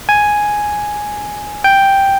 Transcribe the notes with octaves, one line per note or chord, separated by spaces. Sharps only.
G#5
G5